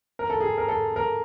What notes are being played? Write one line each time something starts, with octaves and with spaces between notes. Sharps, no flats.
A#4
A4
G#4
A#4
A4
A#4